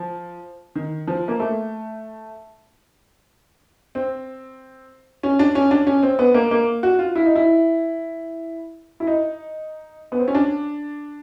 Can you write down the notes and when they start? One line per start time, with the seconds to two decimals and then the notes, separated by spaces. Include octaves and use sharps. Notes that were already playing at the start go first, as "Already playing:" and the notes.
Already playing: F3
0.75 D#3
1.07 F3
1.28 A#3
1.40 A3
3.95 C4
5.23 C#4
5.39 D4
5.55 C#4
5.71 D4
5.87 C#4
6.03 C4
6.19 B3
6.34 A#3
6.51 A#3
6.83 F#4
6.99 F4
7.15 E4
7.26 D#4
7.35 E4
9.00 E4
9.07 D#4
10.12 B3
10.20 C4
10.28 C#4
10.35 D4